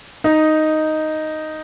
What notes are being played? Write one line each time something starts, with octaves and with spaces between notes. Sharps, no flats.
D#4